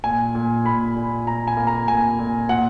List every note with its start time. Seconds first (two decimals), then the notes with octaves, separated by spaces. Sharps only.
0.04 A#2 G#5
0.35 A#2
0.65 A#2 B5
0.96 A#2
1.26 A#2 A#5
1.48 G#5
1.57 A#3
1.67 A#5
1.88 A#2 G#5
2.19 A#2
2.49 A#2 F#5